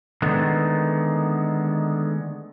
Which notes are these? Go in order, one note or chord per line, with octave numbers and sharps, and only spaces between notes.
D3 D#3 G#3 A3 B3